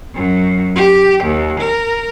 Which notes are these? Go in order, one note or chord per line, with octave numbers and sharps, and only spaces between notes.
F#2
G4
D#2
A#4